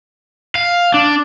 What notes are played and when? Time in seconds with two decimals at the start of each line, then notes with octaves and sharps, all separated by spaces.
0.55 F5
0.94 D4